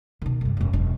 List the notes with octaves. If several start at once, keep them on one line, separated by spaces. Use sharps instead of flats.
B2 D#3
C2 G2
E1 F#2
E1 D4